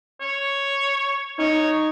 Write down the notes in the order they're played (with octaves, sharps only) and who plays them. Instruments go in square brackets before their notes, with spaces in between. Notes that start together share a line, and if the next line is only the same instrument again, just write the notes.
[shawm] C#5
[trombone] D#4 [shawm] C#5